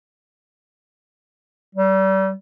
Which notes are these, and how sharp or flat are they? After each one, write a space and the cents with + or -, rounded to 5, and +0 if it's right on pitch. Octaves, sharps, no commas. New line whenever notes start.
G3 -35